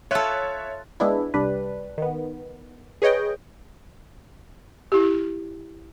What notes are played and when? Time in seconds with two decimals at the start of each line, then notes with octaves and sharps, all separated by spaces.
0.11 F4 A4 C#5 E5 F#6
1.00 G#3 B3 D4 E4
1.34 C2 G3 D4 B4
1.98 D#3 B3
3.02 G#4 B4 C#5 D#5 G5
4.92 E4 G4